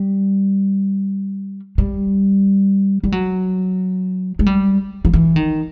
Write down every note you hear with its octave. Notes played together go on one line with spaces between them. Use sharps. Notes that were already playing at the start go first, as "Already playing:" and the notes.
Already playing: G3
G3
G3
F#3
G#3
G3
F3
E3
D#3